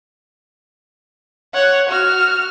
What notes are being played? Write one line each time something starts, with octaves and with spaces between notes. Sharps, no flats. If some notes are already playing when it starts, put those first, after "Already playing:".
C#5 F#5
F#4 F6